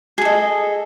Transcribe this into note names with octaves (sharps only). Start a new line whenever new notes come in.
G#4 A4 D#5